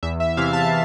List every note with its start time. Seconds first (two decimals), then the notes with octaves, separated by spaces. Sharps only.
0.03 E2 E5
0.20 E5
0.37 C3 E3 F5
0.53 A5